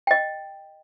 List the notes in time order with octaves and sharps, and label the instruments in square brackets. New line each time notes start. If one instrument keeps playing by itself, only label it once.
[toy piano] D#5 G5